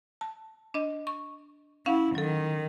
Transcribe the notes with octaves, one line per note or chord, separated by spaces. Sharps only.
A5
D4 D#5
C#6
C#4 E4 F5 F#5
D#3 F#3 A4